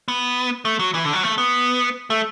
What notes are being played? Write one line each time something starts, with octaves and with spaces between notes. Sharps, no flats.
B3
A3
F#3
E3
D3
F#3
A3
B3
A3